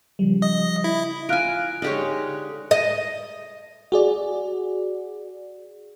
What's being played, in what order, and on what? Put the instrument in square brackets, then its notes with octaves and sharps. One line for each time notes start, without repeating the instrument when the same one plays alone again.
[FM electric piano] C#3 F3 G3
[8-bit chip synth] D#5
E4
[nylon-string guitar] F4 [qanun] A#4 G#5 [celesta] F6 F#6 D7
[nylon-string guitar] D3 D#4 G#4 [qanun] G#3 G4 C#5
[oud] D#5
[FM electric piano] F#4 G#4 D5